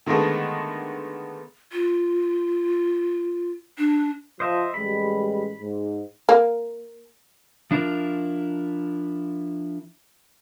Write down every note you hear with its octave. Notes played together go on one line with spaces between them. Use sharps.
D3 D#3 G#3 A3 B3
F4
D4
F3 C5 D#5 E5
A1 G3 G#3 B5
G#2
A#3
F3 D4 E4 F4 A#4